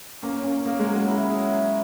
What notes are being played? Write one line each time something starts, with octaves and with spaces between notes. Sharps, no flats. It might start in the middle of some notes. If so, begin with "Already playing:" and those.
A#3 C#4
A#3 C#4
A#3 G#4
G#3
F#3
F#4
E4
G#4
F#3